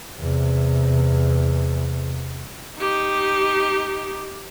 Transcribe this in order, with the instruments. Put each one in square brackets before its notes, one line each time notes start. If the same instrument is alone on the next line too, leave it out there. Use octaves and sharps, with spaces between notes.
[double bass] E2 C3
[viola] D#4 G4